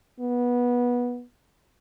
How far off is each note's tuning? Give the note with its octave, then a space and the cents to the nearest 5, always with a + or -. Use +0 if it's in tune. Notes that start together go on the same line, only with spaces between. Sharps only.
B3 -20